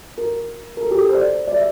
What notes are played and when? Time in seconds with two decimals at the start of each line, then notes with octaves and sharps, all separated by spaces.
0.18 A#4
0.77 A#4
0.82 A4
0.91 G4
0.98 A4
1.09 C5
1.15 D5
1.47 D5
1.56 E5